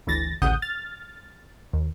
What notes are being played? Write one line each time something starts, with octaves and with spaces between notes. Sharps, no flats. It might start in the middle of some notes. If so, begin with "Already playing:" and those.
G1 D2 E3 A6 A#6
A1 D2 C#3 F#5 D#6 G6
F6 A6
D#2